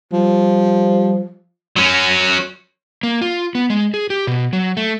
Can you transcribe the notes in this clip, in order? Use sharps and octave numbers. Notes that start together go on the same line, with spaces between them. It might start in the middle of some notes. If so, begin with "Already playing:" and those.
F3 G3
F#3 C#4
A#3
F4
B3
G#3
G#4
G4
B2
F#3
A3